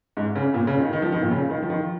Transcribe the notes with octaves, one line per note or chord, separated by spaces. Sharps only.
G#2
C#3
A#2
C#3
D#3
D#3
F3
D#3
A#2
C#3
D#3
F3
D#3